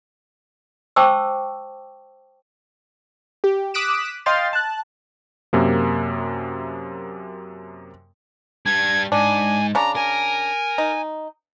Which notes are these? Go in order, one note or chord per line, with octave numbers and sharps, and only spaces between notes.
C5 G5 A5 C#6 D6 E6
G4
D6 D#6 F#6 B6 D7 E7
D#5 F5 G5 C6 F6 A6
A5 F#6
F#2 C3 A#3
G3 D4 G#6
G#2 D4 G#5
C#3 D4 A#5
A#4 G#5
D#4